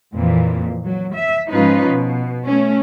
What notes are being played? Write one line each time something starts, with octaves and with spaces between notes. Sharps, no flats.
F2 A#2 E3
F#3
E5
G#2 F3 C#4 D#4 F4 B4
B2
A3 C#4